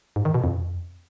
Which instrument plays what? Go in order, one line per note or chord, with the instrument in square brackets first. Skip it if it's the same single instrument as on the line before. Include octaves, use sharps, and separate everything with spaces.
[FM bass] G#2
D#3
B2
F2